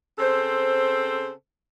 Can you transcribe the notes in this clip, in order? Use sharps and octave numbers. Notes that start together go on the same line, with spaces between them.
C#3 C4 A4 C5